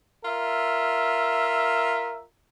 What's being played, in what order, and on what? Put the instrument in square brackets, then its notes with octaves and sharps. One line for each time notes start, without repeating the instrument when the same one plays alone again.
[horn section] F4 A#4 E5